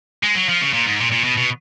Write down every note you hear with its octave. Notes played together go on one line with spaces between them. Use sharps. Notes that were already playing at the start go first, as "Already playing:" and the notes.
G#3
F#3
F3
C#3
A#2
G#2
A#2
A#2
B2
B2